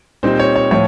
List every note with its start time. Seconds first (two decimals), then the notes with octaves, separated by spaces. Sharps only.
0.23 A#2 G3 C4 D#4 C5
0.40 C#5
0.56 C#5
0.71 A2 F3 C#5